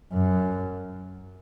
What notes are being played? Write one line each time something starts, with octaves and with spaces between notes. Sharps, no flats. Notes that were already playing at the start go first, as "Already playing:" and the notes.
F#2